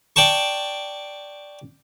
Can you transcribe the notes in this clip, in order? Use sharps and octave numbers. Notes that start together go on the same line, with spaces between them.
D5 G5 A5 C#6